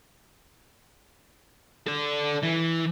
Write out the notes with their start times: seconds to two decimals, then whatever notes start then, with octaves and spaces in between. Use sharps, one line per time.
1.87 A4 D5
2.43 E3 E4